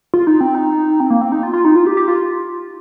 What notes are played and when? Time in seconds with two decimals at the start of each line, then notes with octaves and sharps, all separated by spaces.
0.14 F4
0.27 D#4
0.41 C4
0.55 D#4
1.00 C4
1.10 A#3
1.21 C4
1.32 D#4
1.43 F4
1.53 F4
1.65 D#4
1.76 F4
1.87 G4
1.97 G4
2.08 F4